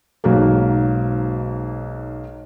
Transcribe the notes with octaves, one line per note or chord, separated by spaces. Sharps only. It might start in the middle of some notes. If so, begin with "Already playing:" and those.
B1 G#2 F#3 A#3